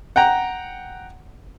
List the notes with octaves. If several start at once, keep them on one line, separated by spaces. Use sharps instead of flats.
F#5 G5 A#5